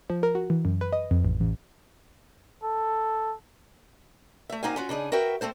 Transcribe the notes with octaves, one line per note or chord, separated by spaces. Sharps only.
F3
A#4
F#4
E3
F#2
B4
D#5
F2
A1
A1
A4
A3 E5
A#3 C4 D#4 F#4 F5 G#5
C#4 F4 F#4
C#3 D4 D#4 G#4
F#4 A#4 B4 E5 G5
A3 C4 A4 C5